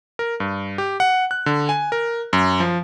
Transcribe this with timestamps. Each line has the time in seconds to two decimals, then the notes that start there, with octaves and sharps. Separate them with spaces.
0.19 A#4
0.40 G2
0.78 G4
1.00 F#5
1.31 F#6
1.46 D3
1.69 G#5
1.92 A#4
2.33 F#2
2.60 F3